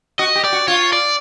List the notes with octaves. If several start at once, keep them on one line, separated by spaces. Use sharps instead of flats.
F#4 D#5
G4
D5
F#4
F4 C#5
D5